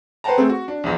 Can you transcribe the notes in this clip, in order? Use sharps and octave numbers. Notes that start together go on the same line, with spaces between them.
B4 C5 F#5 G5 A5 A#5
A3 C4 G#4
F#4
D4
A#1 E2